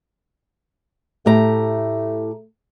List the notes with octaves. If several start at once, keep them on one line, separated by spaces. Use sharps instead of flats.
A2 A3 G4 A#5